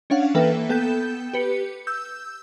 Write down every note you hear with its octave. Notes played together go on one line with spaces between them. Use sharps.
C#4 D4 C#5 F5 F#5
E3 A#3 A4 B4 E5 G5
B3 A4 G5 G6 E7
G4 B4 C#7
E6 G6